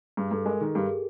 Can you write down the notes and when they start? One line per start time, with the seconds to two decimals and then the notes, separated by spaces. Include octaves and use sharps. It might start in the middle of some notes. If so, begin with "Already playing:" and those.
0.17 G2 G#4
0.31 G2 A4
0.45 G#3 A#4
0.60 D#3 G#4
0.75 G2 G4
0.89 G#4